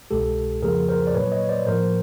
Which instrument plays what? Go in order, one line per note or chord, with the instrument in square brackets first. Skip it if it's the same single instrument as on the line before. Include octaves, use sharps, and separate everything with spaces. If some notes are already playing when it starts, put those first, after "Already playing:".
[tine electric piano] C2 B2 G#3 G4 A4
F2 C#3 F3 A#3 G#4 A#4
A#4 C5
D5
A#2 F#3 A#3 B4 C#5
C#5 D#5
C5 D5
A2 F3 A#3 A#4 C5